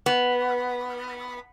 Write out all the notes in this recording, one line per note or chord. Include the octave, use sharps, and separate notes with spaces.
B3